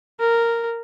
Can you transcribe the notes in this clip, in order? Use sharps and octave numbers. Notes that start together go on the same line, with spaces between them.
A#4